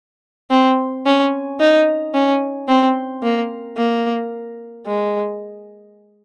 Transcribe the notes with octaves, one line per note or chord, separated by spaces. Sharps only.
C4
C#4
D#4
C#4
C4
A#3
A#3
G#3